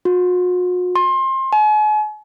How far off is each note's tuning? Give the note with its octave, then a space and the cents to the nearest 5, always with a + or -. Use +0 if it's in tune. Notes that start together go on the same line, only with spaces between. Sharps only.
F#4 -45
C6 +25
G#5 +40